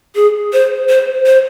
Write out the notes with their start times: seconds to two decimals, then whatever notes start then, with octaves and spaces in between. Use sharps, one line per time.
0.15 G#4
0.53 C5
0.89 C5
1.26 C5